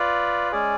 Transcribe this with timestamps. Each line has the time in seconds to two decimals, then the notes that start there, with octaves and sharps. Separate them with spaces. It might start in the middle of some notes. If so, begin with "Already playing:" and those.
Already playing: F4 B4 D5
0.52 G#3 C#4 G#4 D5